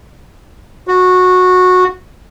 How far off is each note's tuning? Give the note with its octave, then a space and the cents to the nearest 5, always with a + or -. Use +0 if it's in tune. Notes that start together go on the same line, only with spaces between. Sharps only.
F#4 -15